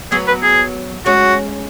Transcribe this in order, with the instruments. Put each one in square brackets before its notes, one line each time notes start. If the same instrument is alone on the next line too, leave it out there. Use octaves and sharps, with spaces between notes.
[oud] F#3 B3 [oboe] G#4
[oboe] B4
G#4
[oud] G#3 C#4 [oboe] F#4